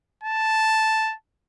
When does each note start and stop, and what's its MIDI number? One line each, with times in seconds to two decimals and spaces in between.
0.24 1.14 81